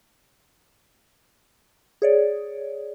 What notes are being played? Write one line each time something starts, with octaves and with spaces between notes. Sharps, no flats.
G#4 C#5 D5